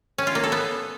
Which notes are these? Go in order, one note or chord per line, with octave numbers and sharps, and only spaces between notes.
C#4
F4
A#3
A4
B3